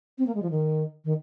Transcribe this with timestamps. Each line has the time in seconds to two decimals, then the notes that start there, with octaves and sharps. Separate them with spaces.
0.18 C4
0.27 A#3
0.35 G#3
0.42 F3
0.51 D#3
1.05 D#3